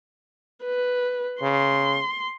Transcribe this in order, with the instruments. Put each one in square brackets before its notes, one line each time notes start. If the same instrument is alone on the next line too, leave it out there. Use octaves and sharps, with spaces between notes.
[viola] B4
[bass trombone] C#3 [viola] C6